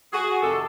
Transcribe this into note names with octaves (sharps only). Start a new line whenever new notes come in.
F#4 G#4
F2 C3 D#3 G4 A4